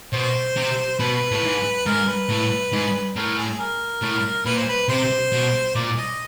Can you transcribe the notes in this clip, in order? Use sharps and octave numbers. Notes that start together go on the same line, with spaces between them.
B2 C5
C3
B2 B4
A2
G#2
G#2 A#4
B4
A2
G#2
A2 A#4
G#4
A#4
A2
A#2 B4
C5
B4
C3 C5
B2
A#2 D5
D#5